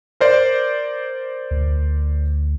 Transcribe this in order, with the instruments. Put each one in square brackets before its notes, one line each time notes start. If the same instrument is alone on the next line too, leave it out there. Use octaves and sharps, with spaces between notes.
[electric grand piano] A#4 C5 D5
[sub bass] D2